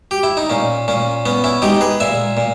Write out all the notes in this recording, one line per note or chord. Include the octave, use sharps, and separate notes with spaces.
G4
E4
D#4
A#2 C#4
A#2 C#4
B3 C#4
C#4 E4
G#3 D#4 G4
G#4 B4
A#2 E5 G#5
A#2